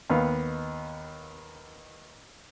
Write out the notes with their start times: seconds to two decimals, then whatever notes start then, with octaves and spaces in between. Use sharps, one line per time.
0.10 D#2 B3 F5